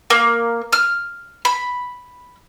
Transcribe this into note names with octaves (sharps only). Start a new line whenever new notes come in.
A#3
F6
B5